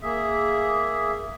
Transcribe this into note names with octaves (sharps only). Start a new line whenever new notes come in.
A#3 G#4 E5